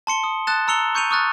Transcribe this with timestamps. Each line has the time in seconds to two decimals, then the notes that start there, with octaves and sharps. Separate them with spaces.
0.07 A5 C6 C#7 G7
0.24 D#6
0.47 A5 D#6 F#6 A6 E7
0.68 A#5 E6 C#7 F7 G7
0.95 C#6 G6 C#7 D#7 F7
1.11 C#6 D#6 F6 F#6 A6